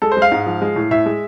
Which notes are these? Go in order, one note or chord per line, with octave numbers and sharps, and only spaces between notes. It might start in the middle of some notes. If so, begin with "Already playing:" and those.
G#3 A4
C5
G#3
F5
G#2
F3
G#3
A2
A2 E5
G#3